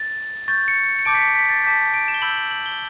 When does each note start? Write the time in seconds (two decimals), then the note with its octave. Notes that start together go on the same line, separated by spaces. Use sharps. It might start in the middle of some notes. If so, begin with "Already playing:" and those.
Already playing: A6
0.48 C#6 G6 A6
0.68 C#7
0.99 C#7
1.05 A5 D6 G6 D7
1.14 B6
1.21 C#7
1.35 B6
1.50 A6
1.64 A5 D6 G6 B6
1.94 D7
2.08 E7
2.14 G7
2.22 B5 E6 G6 F#7
2.37 F#7
2.51 F#7
2.66 G7